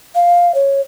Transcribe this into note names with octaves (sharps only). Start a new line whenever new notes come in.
F5
C#5